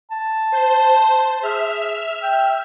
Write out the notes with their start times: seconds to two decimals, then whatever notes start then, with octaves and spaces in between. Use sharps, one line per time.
0.11 A5
0.52 C5
1.43 G#4 E5 F6
2.23 G5